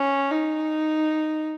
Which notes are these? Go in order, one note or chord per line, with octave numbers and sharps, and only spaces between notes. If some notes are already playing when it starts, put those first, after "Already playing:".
Already playing: C#4
D#4